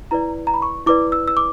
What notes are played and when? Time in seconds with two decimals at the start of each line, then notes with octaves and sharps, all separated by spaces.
0.11 E4 B4 D5 A#5
0.47 A#5
0.54 B5
0.62 C#6
0.86 E4 B4 D5 D6
1.12 E6
1.28 E6
1.37 D6